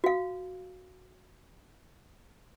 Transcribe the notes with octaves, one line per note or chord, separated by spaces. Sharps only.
F#4 F5